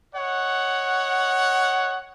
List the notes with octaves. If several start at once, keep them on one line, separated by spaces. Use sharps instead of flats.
C#5 D#5 F#5